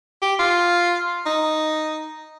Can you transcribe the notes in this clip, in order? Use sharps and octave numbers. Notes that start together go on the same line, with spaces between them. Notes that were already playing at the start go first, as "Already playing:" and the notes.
G4
F4
D#4